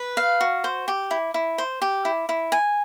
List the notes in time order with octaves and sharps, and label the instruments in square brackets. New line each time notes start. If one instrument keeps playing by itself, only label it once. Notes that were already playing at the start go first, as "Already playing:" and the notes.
Already playing: [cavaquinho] B4
F5
F#4
C5
G4
E4
E4
C5
G4
E4
E4
G#5